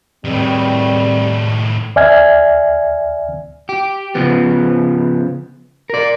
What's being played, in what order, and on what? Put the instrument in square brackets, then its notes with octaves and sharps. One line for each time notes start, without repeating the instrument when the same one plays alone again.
[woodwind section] E2 C4 [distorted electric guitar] A2 D#3 [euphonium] G3
[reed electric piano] D2 D5 E5 G#5 F6 G#6
[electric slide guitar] G4
C#3 F3 B3
A#4 D5